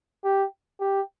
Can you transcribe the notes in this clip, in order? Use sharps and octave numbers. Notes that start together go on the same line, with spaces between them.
G4
G4